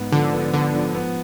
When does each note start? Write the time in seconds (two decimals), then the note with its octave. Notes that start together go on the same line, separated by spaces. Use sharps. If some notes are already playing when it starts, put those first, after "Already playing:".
Already playing: G#2 B3
0.12 D3 F3
0.33 B3
0.54 D3 B3
0.75 F3
0.95 B3